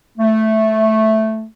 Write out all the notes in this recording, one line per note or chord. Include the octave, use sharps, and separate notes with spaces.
A3